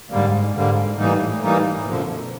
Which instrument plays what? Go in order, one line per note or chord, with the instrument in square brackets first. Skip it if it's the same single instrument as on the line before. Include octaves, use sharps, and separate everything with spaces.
[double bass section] G#2 [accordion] D3 G3 A#3
[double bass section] G#2 [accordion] D3 G3 A#3
[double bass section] A2 [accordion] E3 G3 A#3 D#4
[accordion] E3 G3 A#3 D#4
[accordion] F#2 D3 F3 [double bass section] B2